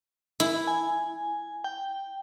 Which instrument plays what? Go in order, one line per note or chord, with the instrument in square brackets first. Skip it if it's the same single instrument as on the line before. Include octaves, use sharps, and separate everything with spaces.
[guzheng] E4
[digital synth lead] G#5
G5